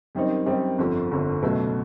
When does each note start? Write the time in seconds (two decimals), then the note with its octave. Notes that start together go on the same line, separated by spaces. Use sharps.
0.15 F#2 D#3 G3 C4 D#4
0.46 F#2 D#3 G3 C4 D#4
0.78 G1 F2 D3 F3
1.11 G1 F2 D3 F3
1.42 C#2 B2 F#3 A3